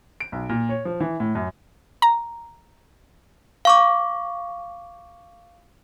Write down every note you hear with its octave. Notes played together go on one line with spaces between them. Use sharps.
D7
B1
A#2
C#5
F3
E3
A2
F#2
A#5
F5 C#6 D6